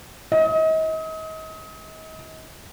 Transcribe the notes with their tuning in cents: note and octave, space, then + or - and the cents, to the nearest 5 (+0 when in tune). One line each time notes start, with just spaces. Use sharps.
D#5 +35